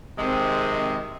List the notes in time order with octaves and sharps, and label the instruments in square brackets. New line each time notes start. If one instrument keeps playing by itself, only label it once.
[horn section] C3 D#3 G#3 [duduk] C4